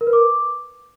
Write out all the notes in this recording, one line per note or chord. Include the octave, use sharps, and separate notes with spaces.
A#4
B4
D6